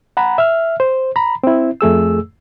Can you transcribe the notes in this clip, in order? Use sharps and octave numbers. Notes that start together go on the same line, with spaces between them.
F#5 A#5 B5
E5 F6
C5
A#5 B5
C4 E4
F2 A3 G#4 E6